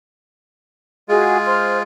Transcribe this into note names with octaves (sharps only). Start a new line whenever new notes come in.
G#3 F4 F#4 G#4 D#5
C5 C6 F6